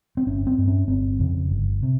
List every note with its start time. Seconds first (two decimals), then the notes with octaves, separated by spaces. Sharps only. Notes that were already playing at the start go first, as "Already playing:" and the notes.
0.17 C4
0.26 G1 C#4
0.47 C4
0.58 G2
0.68 C#4
0.88 G1 C4
1.19 F2 C#3
1.49 G1
1.83 C3